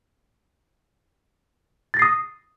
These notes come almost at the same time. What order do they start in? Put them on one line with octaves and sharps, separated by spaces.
A6 A#6 C7 D#6